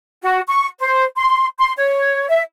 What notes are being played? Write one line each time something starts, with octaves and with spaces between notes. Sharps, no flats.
F#4
C#6
C5
C6
C6
C#5
E5